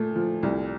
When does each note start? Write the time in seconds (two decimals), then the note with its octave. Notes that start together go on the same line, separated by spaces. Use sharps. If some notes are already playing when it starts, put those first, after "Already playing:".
Already playing: A#2 A3
0.15 F3
0.43 C2